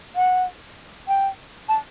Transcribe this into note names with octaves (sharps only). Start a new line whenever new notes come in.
F#5
G5
A5